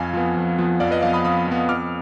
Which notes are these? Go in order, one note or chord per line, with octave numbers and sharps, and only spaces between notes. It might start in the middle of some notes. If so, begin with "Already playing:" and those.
Already playing: F2 F5 G#5
F3 B3
F2
F3 B3
F2 D5 F5
B4 D#5
F3 B3 D5 F5
B5 D#6
F2 B5 D#6
F3 B3
F2 D6 F6